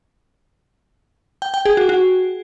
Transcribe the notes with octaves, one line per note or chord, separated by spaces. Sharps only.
G5
G5
G#4
F#4
F#4